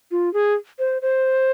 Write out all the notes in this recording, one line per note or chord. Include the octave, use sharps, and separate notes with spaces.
F4
G#4
C5
C5